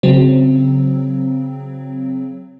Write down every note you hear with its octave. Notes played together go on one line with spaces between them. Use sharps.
C#3 F#3 C4